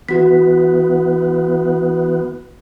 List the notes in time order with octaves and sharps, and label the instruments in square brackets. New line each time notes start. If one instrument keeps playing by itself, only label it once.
[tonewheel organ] E3 B3 [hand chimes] F#4 B6